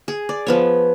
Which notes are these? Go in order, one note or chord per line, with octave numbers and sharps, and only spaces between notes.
G#4
D5
F3 B3 C#5